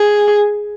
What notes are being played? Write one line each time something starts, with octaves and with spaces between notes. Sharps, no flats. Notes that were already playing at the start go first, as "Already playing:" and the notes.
Already playing: G#4